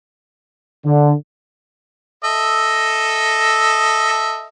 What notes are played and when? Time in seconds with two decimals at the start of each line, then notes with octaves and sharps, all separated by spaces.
0.85 D3
2.24 A4 D#5 E5